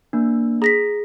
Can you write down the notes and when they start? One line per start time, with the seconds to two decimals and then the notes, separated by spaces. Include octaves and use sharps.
0.13 A#3 D4
0.62 G#4 A#5 A#6 B6